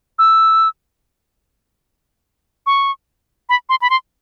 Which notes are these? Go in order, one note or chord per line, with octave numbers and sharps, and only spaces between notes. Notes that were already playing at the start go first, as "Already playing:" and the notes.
E6
C#6
B5
C6
B5
C6